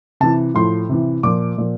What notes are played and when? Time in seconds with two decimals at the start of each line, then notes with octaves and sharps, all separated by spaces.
0.20 C3 E3 A5
0.54 A2 F3 C6
0.89 C3 E3
1.23 A#2 F3 D6
1.58 A#2 F3